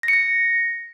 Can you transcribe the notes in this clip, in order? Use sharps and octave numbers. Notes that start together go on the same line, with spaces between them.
A#6
C#7
A#6